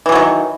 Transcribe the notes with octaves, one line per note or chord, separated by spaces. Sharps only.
D#3 E3 F#3 G3